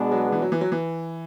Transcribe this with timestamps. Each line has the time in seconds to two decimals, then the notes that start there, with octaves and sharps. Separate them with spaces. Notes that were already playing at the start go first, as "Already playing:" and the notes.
Already playing: B2 G#3 B3 D4 G#4
0.12 F#3
0.32 E3
0.42 F#3
0.52 E3
0.61 F#3
0.72 E3